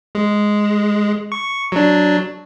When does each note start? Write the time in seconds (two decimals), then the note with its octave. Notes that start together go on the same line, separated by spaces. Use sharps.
0.15 G#3
1.32 C#6
1.72 F#3 D4